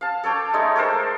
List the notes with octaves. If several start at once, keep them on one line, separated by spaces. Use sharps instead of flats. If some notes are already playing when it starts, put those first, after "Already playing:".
F5 A5
A4 C#5 G5 D6
G#3 A3 D#4 C#5
A4 A#4 C5 G5